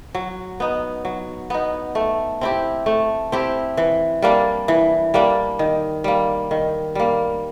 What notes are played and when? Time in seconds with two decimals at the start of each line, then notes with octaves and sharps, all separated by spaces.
0.14 F#3
0.60 B3 D#4
1.05 F#3
1.50 B3 D#4
1.95 A3
2.41 C4 E4 G4
2.86 A3
3.32 C4 E4 G4
3.77 E3
4.22 G3 A#3 D4
4.68 E3
5.14 G3 A#3 D4
5.59 D#3
6.04 G3 A#3
6.51 D#3
6.95 G3 A#3